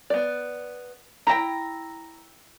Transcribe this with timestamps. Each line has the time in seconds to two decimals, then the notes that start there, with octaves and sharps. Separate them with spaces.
0.10 B3 D5
1.27 E4 G5 A#5